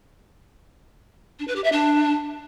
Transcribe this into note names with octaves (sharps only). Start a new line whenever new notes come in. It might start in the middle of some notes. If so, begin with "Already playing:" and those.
D4
B4
G4
E5
D4